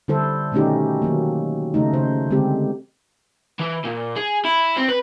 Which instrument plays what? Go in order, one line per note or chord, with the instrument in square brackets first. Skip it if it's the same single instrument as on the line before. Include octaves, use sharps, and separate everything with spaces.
[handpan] D3 G3 E4 A4 C5
B2 D#3 A3 C#4 D#4 G4
D#3 F#3 A#3
C#3 A3 D#4
C#3 C5
D3 G#3 C4 G4
[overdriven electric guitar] E3
A#2
G#4
E4
C4
B4